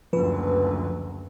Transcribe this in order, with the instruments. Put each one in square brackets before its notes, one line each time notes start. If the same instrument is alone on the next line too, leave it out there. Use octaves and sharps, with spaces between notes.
[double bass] F#1 D2 [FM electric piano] F3 B4